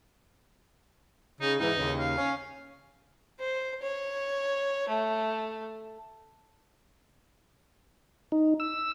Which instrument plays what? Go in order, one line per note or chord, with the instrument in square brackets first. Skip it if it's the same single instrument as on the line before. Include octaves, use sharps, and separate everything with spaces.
[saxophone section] C#3 [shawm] D#4
[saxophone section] E2 G#2 E3 [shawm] D#4
[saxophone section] D#2 C#3
[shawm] F5
[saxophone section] C#4
[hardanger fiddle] C5
C#5
A3
[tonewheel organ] D#4
E6